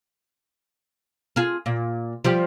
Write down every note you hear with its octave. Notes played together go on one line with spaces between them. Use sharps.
F4 G#4
A#2
F3 G3 G4